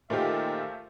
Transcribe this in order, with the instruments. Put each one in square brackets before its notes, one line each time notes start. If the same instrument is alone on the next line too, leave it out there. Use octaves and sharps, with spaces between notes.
[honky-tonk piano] A#2 G4 [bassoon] D#3 [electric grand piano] A3 F4 C5 [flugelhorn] E5